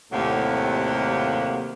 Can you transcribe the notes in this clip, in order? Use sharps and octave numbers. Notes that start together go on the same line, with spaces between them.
D#2 A2 C3 F#3 A#3